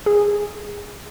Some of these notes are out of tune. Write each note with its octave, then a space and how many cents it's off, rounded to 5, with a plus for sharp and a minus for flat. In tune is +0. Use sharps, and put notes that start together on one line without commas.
G#4 -10